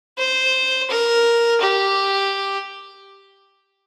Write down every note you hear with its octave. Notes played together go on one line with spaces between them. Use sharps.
C5
A#4
G4